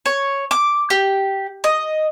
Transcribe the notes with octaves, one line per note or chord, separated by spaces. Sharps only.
C#5
D6
G4
D#5